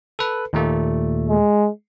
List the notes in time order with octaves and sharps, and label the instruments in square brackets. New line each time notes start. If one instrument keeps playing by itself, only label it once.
[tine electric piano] A4 B4
D#2 A#2 A3
[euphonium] G#3